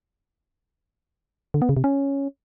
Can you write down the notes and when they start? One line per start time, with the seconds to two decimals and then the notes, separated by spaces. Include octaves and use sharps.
1.54 D3
1.62 B3
1.69 C#3
1.77 C3
1.84 C#4